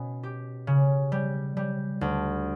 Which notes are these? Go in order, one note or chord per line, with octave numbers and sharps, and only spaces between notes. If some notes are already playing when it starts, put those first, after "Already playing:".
Already playing: B2 C#4
G4
C#3
G3
G3
D2